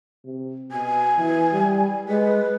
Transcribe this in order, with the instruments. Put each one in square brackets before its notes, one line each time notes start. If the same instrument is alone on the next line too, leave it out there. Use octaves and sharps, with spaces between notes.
[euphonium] C3
[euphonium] B2 [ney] G#5
[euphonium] E3
G3
[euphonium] G#3 [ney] B4